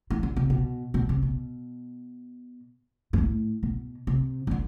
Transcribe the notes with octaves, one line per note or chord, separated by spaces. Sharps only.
E3
D3
C3
B2
B2
C3
B2
G2
A2
B2
C3
E3
D3